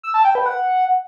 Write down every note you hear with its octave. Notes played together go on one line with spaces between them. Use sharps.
E6
A5
G5
B4
F#5